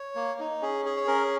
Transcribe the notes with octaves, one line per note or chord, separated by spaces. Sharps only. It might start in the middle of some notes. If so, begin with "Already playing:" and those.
Already playing: C#5
A#3
D#4
C#4 G#4
G#4
C#5
C#4 A#4